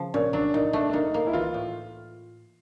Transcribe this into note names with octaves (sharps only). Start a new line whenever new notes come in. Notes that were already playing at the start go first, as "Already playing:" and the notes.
Already playing: C#3 F3
A#2 C#4
F#3 D4
A#2 D#4
A3 D4
D4
A#3 D#4
A#3
E4
E3 F4
A2